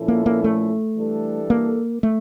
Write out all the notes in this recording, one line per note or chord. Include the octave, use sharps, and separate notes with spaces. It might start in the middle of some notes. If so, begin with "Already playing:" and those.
Already playing: A#2 F3 C#4 E4 A4
A#3
A#3
A3
E3 G3 D4 A4
A#3
A3